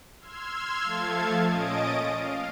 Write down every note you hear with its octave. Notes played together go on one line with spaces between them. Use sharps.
C6 E6 F6 G#6
F3 A3 A4 F5 A5 G#6
A#2 C#4 D#5 D#6 A6 D7
F5